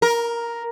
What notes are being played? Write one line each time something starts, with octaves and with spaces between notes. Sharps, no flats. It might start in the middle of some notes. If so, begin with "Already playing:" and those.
A#4